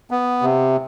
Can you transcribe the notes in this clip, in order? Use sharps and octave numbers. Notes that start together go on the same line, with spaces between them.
B3
C3